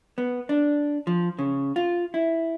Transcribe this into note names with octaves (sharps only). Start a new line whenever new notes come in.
B3
D4
F3
C#3
F4
E4